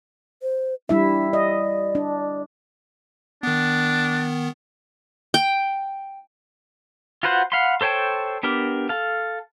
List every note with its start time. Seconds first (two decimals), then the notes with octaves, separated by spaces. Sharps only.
0.42 C5
0.89 G3 D4 E4 E5
1.33 D5 D#5
1.95 D4
3.43 D#3 B3 D4
5.34 G5
7.23 F4 F#4 B4 C5 F#5
7.52 F5 F#5 B5 C6
7.81 A4 C5 C#5 G5 A5
8.43 B3 D4 G4 A#4
8.89 A4 F5